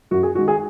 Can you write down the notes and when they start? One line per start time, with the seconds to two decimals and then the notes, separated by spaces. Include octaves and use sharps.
0.11 F#2 F#4
0.23 G#4
0.35 D#3 G#3 F#4
0.48 G#4